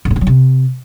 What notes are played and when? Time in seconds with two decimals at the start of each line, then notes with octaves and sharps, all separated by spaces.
0.05 A2
0.11 A#2
0.16 C#3
0.21 F#3
0.27 C3